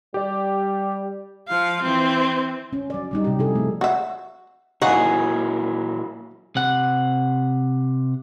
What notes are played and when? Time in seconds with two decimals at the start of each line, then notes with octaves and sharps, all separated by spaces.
0.14 G3 G4 D5
1.48 F3 F5
1.83 E3 C4
2.73 C#4
2.90 F#3 D5
3.11 F#3 G3 D#4
3.24 C3 G4
3.39 C3 F3 E4 G#4 A4
3.55 A3
3.81 F#4 E5
4.82 A#2 F#3 A#3 D#4 E4 F#4 G#4
6.56 C3 F#5